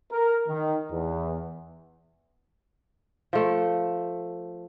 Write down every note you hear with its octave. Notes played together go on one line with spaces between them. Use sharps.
A#4
D#3
E2
F3 A3